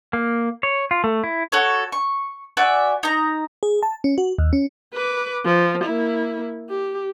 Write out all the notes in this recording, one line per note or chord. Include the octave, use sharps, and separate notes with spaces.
A#3
C#5
F4
A3
E4
F#4 A4 C#5
C#6
F#4 D5 E5 G#5
D#4 A#5
G#4
A5
C#4
F#4
D#2
C#4
B4 D6
F3
A#3 E4
G4